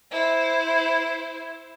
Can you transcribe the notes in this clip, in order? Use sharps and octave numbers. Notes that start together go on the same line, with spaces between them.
E4 C5